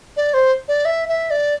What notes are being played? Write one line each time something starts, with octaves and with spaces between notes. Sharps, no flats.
D5
C5
D5
E5
E5
D5